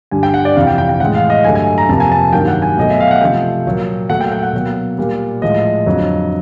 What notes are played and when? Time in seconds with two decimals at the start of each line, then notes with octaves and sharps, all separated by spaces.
0.11 G2 D3 G3 G#5
0.23 G5
0.34 F#5
0.45 D5
0.56 F2 C3 E3 F5
0.67 G5
0.78 G5
0.89 G5
1.00 A2 E3 G#3 F#5
1.15 F5
1.30 D#5
1.44 G2 D3 F#3 A3 G#5
1.55 G#5
1.78 A#5
1.89 F2 C3 F3 A#3 A5
2.00 G#5
2.12 A5
2.33 G2 D#3 F#3 A#3 G5
2.48 F#5
2.62 G#5
2.77 B2 F#3 A3 D#5
2.90 E5
3.00 F5
3.11 F#5
3.21 C3 F3 A3 G5
3.65 A#2 F#3 A#3
4.09 A#2 F#3 A3 F#5
4.21 G5
4.32 G5
4.43 F#5
4.53 B2 F#3 A#3
4.98 A#2 G3 A#3
5.42 A2 F3 G#3 D#5
5.86 F2 D3 F#3